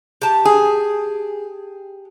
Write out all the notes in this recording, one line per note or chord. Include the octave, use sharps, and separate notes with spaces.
G4 A5
G#4